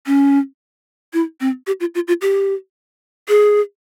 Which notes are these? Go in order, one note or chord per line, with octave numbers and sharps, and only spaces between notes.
C#4
E4
C4
G4
F4
F4
F4
G4
G#4